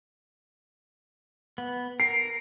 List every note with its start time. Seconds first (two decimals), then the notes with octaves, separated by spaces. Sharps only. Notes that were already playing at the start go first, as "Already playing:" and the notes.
1.58 B3
2.00 A#4 C7